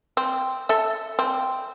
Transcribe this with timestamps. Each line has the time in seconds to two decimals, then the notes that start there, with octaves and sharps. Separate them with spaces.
0.17 C4
0.69 A4 E5
1.19 C4